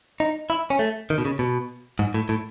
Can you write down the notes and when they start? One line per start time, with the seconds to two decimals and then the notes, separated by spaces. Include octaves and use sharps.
0.20 D#4
0.50 E4
0.70 C#4
0.79 A3
1.10 D#3
1.18 B2
1.25 C#3
1.39 B2
1.99 G#2
2.14 A2
2.29 A2